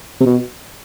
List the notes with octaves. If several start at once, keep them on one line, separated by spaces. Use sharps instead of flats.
C3
B2